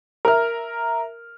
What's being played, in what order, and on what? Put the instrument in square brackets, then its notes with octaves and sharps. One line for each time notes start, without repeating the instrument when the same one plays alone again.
[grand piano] A#4 E5 F6